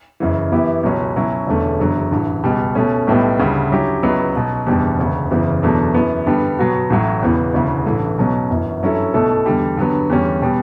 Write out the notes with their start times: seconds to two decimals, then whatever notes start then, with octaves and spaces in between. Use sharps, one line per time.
0.20 F#1 F#2 C#3 E3
0.52 F#2 E3 B3 E4 G4
0.84 C#2 B2 F#3 C#4
1.16 B2 F#3 C#4 E4
1.47 E1 E2 D3 A3 C#4
1.79 F#1 E2 D3 F#3
2.11 A1 G2 E3
2.44 C#2 B2 G3
2.75 B2 A3 C#4
3.07 B1 A2 G3 B3
3.39 D2 C#3 G3
3.71 G2 F#3 C#4 E4 G4
4.03 C#2 C#3 F#3 B3 E4
4.35 B1 B2 F#3 B3
4.67 F#1 E2 B2 G3 D4
4.98 E1 D2 C#3
5.31 F#1 E2 C#3 E3
5.63 E2 B2 F#3 A3 D4
5.94 F#2 E3 B3
6.26 G2 D3 G3 B3
6.58 B2 F#3 B3 F#4
6.90 A1 A2 F#3
7.22 E1 E2 C#3 E3 B3
7.54 E1 D2 C#3 E3
7.86 A1 G2 E3 A3
8.18 B1 B2 F#3 C#4
8.50 G1 F#2 E3
8.82 G2 F#3 C#4 E4 A4
9.14 B1 B2 A3 E4 A4
9.46 E2 D3 G3
9.77 G2 D3 F#3 B3
10.10 E2 D3 G3 C#4
10.42 B2 G3 B3